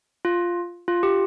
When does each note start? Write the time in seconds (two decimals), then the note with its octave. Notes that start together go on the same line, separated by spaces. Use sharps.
0.25 F4
0.88 F4
1.03 G4